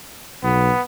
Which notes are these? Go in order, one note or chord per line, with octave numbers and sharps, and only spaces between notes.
B1 B3